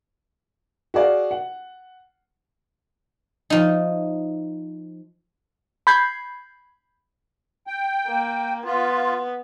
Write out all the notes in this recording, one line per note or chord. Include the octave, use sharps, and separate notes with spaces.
F#4 G#4 D5 F5
F#5
F3 D#4
B5 G6 G#6 C7
G5
A#3
B3 F4